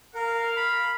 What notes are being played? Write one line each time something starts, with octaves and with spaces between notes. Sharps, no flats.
A#4 F5
B5